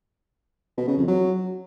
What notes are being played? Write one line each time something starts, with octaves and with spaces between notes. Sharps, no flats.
B2
C#3
F2
F#3